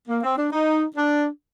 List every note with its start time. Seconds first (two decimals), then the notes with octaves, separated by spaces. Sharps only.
0.08 A#3
0.23 C4
0.38 D4
0.52 D#4
0.96 D4